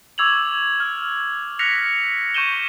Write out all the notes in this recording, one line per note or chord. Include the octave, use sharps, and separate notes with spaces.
C#6 D6 E6 G#6 F7 F#7
F6
F6 F#6 A#6 B6 C#7 F7
C#6 G6 D#7 E7 G7